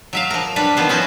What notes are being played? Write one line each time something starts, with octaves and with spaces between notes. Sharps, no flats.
F#3 E5 F5
F3 A#4
G3 D4 B4
D#3 F3 B3 C5
C#4 E4 F#4 B4 C5